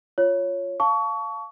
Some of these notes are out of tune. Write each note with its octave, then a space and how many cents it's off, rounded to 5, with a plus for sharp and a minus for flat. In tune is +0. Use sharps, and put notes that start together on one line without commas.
F4 +0 C#5 +0
F5 +0 A5 +0 C#6 +30